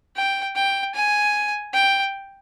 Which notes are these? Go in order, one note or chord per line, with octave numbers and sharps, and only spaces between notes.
G5
G5
G#5
G5